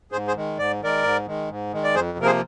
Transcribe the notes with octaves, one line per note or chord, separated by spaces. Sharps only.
G#2 G#4 C5
G#4 C5
D#3 G#3
G#2 D5
D#3 G#3 A#4 D5
G#2
D#3 G#3
G#2
D#3 G#3
D5
F2 G#4 C5
C3 F3 A#3 A#4
G#4 C5